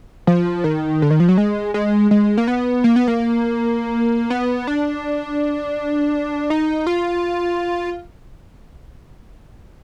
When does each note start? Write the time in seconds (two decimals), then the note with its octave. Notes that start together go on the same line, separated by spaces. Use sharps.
0.27 F3
0.64 D#3
1.02 D3
1.11 D#3
1.20 F3
1.29 F#3
1.38 G#3
1.74 G#3
2.11 G#3
2.38 A#3
2.47 B3
2.84 A#3
2.96 B3
3.08 A#3
4.30 B3
4.67 D4
6.50 D#4
6.87 F4